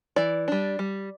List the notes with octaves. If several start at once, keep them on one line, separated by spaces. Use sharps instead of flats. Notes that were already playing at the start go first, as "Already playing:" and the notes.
E3 D5
G3 D4
G3